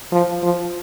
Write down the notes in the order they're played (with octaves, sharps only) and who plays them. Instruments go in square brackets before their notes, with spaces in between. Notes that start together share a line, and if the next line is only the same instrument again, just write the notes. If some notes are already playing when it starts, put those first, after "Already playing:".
[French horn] F3
F3